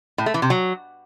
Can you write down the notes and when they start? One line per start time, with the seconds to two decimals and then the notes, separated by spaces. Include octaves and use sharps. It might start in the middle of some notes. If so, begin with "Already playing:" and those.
0.18 A2
0.26 A3
0.34 E3
0.42 C3
0.50 F#3